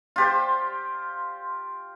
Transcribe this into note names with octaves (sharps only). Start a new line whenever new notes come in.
F4 G4 C5